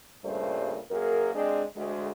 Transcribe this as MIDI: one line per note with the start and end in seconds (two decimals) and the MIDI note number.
0.24 0.79 43
0.24 0.79 46
0.24 0.79 49
0.24 0.79 55
0.24 0.79 57
0.24 0.79 72
0.91 1.32 42
0.91 1.32 58
0.91 1.32 68
0.91 1.32 70
1.35 1.63 56
1.35 1.63 60
1.35 1.63 62
1.76 2.11 38
1.76 2.11 56